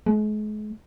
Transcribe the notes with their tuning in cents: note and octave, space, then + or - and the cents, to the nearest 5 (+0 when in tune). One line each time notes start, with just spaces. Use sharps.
G#3 +40